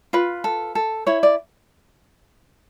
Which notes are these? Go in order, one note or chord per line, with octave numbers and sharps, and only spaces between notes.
F4 B4
A4
A4
E4 C#5
D5